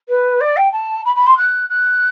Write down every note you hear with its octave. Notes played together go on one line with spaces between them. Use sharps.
B4
D5
G5
A5
B5
B5
C6
F#6
F#6